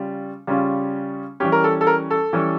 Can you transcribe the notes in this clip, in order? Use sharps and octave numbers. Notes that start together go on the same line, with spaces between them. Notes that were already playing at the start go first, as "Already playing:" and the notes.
Already playing: C#3 G3 C#4 F4
C#3 G3 C#4 F4
E3 G3 C#4 G4
A#4
A4
A4
A#4
A4
E3 G3 C#4